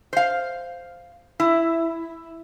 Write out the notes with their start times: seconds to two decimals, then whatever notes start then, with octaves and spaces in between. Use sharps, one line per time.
0.13 C5 F5
1.40 E4